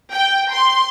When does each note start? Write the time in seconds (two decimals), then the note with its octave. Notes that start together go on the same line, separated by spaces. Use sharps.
0.13 G5
0.51 C6